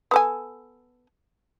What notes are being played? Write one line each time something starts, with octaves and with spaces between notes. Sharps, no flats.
B3 A4 G#5